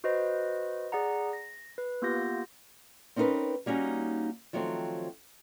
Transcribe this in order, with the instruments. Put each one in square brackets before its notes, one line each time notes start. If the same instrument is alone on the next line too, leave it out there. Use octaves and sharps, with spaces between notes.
[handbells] F#4 B4 C5 D#5
G#4 D5 F#5 A#5
A#6
B4
A#3 B3 F4 G4 G6 A#6
[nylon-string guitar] C4 C#4 D#4 F4 A#4 B4
G3 A#3 C#4 D#4 F#4
D#3 F3 F#3 A3 C4